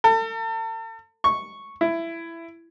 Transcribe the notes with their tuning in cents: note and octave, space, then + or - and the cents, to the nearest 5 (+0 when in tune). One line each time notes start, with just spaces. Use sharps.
A4 +40
C#6 -5
E4 +15